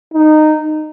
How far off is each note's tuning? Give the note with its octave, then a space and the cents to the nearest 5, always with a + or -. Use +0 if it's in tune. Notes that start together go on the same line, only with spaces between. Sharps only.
D#4 -15